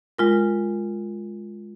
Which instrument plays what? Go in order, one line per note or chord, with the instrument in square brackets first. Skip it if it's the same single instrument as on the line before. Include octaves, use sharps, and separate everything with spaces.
[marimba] G#3 F4 A#4